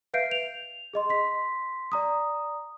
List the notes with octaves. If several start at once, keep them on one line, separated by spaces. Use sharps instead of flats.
B4 E5 F5 G6 C7 D7
F7
G#4 D#5 C6
C6 B6
D5 A#5 D#6